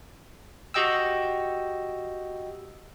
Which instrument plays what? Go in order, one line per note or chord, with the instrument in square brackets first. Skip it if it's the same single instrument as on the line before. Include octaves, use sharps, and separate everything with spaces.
[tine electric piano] F#4 G4 D#5 G5 E6